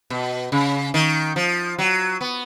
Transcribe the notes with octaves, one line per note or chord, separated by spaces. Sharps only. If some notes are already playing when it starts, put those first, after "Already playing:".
B2
C#3
D#3
F3
F#3
B3